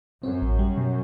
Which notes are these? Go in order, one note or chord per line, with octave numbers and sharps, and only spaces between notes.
F#2 C4
A1
G3
B2